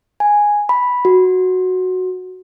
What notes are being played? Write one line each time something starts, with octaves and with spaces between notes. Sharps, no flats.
G#5
B5
F#4